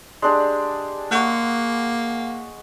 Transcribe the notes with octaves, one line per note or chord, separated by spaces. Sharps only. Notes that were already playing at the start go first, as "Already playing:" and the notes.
G#3 D4 G4
A#3 F#5 C#6